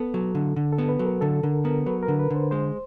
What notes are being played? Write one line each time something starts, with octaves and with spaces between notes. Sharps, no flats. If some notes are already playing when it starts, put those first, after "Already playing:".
Already playing: B3 A4
F#3
D3
D3
A4
B3
B4
F#3
A#4
D3 A4
D3 A#4
B3 A#4
F#3 B4
A#4
D3
B4
D3 C5
G#3 C5